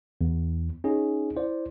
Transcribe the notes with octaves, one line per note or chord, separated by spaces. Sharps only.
E2
C#4 D#4 G#4
E4 C5 D5